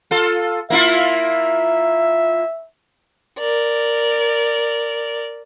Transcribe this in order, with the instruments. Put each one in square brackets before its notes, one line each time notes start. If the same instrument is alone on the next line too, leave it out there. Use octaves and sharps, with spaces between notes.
[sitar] F4 A4
[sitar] A#3 E4 F4 [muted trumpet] E5
[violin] A#4 D5